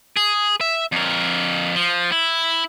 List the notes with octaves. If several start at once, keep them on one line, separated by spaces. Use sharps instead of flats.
G#4
E5
F2 A#4
F3
E4